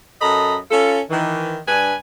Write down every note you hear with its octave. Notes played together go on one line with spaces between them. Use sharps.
F#2 A4 D#5 A#5 B5
C#4 F4 A4
D#3 E3
G2 D4 B4 G#5